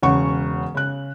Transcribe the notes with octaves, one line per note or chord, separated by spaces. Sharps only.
E1 C#3 C#4 F#5 C#6
C#3 F#6